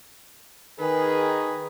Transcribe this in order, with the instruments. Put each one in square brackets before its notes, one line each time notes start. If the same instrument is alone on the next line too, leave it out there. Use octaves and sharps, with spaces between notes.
[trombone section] D#3 G#4 [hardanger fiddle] B4